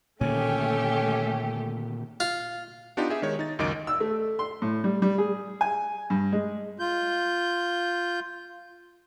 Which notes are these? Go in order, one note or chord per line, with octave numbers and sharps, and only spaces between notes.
A#2 D3 D#3 A3 C#4 G4
F4
B3 D4 D#4 F4 G4
G4 G#4 E5
D#3 G#3 C#5
D#4 A6
C#2 F#2 D#3 D#5 D6 D7
E6
A3
C6
A2
G3
G3
G#4
G#5
G2
G#3
F4 G6